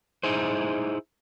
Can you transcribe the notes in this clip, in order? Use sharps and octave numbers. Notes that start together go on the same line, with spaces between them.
D#4 E4 G#4 C5